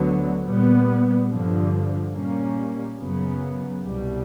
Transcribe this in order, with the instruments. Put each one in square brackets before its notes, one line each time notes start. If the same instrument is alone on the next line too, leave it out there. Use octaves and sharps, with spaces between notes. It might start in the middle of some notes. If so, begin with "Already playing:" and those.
Already playing: [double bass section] D2 D3 F#3 B3
A#2 G3 B3
G2 D3 F3
A#2 G3 A#3 C#4
F#2 C#3 F#3 B3
C2 B2 G3